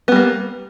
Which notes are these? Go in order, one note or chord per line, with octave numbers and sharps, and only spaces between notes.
G3 A#3 B3